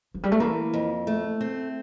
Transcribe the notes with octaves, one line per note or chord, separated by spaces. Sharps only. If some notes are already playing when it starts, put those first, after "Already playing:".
F3
G3
A3
E3 A#3
F2
A3
C4